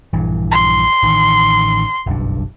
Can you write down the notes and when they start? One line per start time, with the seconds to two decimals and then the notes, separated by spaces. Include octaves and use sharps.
0.13 A#1 G2 E3
0.51 C6
1.03 A1 D#3
2.06 F#1 B1 G2